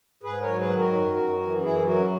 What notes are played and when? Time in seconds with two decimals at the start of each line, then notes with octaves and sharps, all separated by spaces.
0.23 G#2 G#4 B4
0.41 A#4 C#5
0.47 F#3
0.58 G#4 B4
0.70 D#3
0.76 F#4 A#4
0.93 F#2
1.16 F#2
1.39 E3
1.62 F#2 E4 G#4
1.85 F#3 F#4 A#4